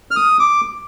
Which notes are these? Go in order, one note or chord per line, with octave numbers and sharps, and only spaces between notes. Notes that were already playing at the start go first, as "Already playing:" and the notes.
F6
D#6
D6